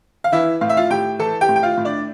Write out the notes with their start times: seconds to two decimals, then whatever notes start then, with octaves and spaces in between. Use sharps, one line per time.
0.24 F5
0.32 E3 E4 E5
0.61 A2 F5
0.69 E5
0.77 F4 F5
0.90 A2 G4 G5
1.19 E3 A4 A5
1.41 G4 G5
1.49 A2
1.56 G5
1.63 F4 F5
1.77 A2
1.85 D4 D5